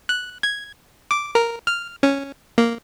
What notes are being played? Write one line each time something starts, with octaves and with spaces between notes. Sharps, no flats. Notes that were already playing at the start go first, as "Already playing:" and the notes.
F#6
G#6
D6
A#4
F6
C#4
A#3